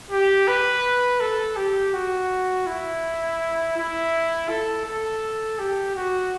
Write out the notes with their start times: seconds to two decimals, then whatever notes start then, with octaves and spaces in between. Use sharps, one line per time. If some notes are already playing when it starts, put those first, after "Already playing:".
0.11 G4
0.47 B4
1.20 A4
1.56 G4
1.94 F#4
2.67 E4
3.77 E4
4.49 A4
4.86 A4
5.59 G4
5.96 F#4